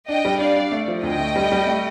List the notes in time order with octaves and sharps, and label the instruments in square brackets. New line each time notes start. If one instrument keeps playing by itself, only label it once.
[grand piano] D4 [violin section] D#5 G5
[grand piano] G3
[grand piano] D4 [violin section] D5 F5
[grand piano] D4
A3
F3
[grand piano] D2 [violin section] D#5 G5
[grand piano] A3
G3
G3
A3